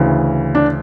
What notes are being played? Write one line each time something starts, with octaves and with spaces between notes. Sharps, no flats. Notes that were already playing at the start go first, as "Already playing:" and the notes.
Already playing: D2 C#3 E3
D4